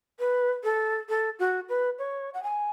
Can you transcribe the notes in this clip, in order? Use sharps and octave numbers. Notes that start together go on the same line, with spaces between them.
B4
A4
A4
F#4
B4
C#5
F#5
G#5